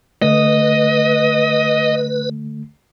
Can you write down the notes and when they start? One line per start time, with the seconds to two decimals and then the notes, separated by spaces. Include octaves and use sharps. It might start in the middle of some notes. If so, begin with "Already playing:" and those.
0.22 D3 A3 B4 D#5